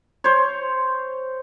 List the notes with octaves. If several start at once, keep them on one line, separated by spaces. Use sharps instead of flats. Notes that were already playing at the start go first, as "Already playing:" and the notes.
C5 C#5